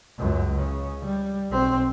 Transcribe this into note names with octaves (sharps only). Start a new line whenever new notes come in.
C#2 F#2
C#3
G3
B1 C4